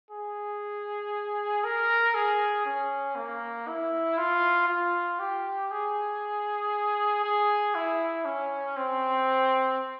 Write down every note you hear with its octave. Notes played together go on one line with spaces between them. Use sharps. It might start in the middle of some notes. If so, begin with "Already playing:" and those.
G#4
A#4
G#4
C#4
A#3
E4
F4
F4
G4
G#4
G#4
E4
C#4
C4